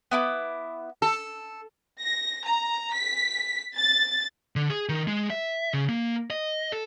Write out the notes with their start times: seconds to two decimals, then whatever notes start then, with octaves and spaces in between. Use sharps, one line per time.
0.11 B3 E4 D6
1.02 A4
2.00 A#6
2.44 A#5
2.92 B6
3.76 A6
4.56 D3
4.70 G#4
4.89 D#3
5.07 G#3
5.30 E5
5.73 C#3
5.89 A#3
6.30 D#5
6.72 A4